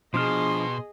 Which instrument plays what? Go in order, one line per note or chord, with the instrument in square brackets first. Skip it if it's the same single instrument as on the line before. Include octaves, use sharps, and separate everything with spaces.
[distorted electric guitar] B2 [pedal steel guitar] F3 D4 F6 [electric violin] G#4 D#5 [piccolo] C6